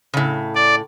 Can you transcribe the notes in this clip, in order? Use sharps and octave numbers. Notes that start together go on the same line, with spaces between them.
A2 C#3
D5